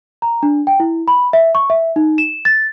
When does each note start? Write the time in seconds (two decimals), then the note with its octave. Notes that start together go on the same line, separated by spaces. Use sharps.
0.22 A#5
0.43 D4
0.67 G5
0.80 E4
1.08 B5
1.33 E5
1.55 C#6
1.70 E5
1.96 D#4
2.18 E7
2.45 A6